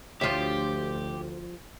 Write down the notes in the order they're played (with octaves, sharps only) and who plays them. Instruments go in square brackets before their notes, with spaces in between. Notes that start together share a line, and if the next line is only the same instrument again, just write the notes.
[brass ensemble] D2 [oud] F3 C#5 [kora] F4 E5 [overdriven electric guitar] G4